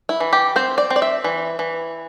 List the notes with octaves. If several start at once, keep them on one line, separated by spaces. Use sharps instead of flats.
E4
E3
G4
C4 C5
D5
C4
D5
E5
E3
E3